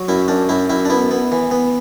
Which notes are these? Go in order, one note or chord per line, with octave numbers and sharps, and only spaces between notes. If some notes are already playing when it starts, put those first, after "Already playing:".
Already playing: F#3
F#2 E4
F#2 D4
F#2 E4
F#2 E4
D4
B3 E4
B3
E3
B3